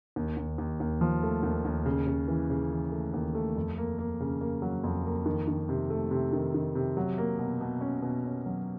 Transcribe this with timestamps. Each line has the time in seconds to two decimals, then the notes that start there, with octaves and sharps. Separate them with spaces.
0.16 D#2
0.37 D#2
0.58 D#2
0.80 D#2
1.01 F3
1.23 A3
1.43 D#2
1.65 D#2
1.86 C#3
2.07 C#3
2.28 E3
2.50 C#3
2.71 E3
2.92 A3
3.14 D#2
3.35 A3
3.57 F2
3.78 A#3
3.99 A#3
4.20 C#3
4.41 A#3
4.62 F#3
4.84 F2
5.06 A#3
5.26 D#3
5.48 D#3
5.69 C3
5.90 A3
6.11 C3
6.33 D#3
6.54 D#3
6.75 C3
6.97 F#3
7.18 A#3
7.39 B2
7.61 B2
7.81 C#4
8.02 B2
8.24 C#4
8.46 F#3